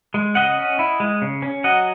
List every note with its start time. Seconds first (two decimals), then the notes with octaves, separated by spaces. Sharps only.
0.14 G#3
0.35 C#3 D#5 F#5
0.58 C#4
0.79 E4
1.00 G#3
1.22 C#3
1.42 C#4
1.64 F#3 D#5 F#5